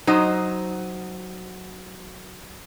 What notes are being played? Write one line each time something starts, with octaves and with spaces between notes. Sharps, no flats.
F#3 D#4 C5